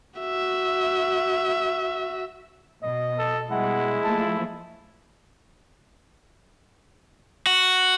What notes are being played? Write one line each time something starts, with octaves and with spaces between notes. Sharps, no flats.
F#4 E5
B2 D#5
A4
B2 G3 G#3 E4 F#5
F3 A3 A#3 A5
F#4